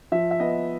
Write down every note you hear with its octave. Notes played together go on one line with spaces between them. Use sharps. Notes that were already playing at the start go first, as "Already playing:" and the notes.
F3 E5
E5
B3 D#5